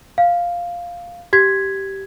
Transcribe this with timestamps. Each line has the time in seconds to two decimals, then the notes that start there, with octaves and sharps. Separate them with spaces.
0.18 F5
1.33 G4 G#6 B6